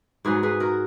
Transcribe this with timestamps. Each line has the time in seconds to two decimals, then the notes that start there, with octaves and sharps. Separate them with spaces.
0.25 G#2 F#3 G#4 B4
0.43 G#4 B4
0.60 F#4 A#4